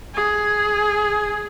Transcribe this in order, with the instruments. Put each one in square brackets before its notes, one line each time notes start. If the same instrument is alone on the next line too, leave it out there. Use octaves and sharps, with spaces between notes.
[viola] G#4